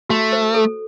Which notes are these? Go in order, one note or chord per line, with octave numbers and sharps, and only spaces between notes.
A3 F#4
C5
A4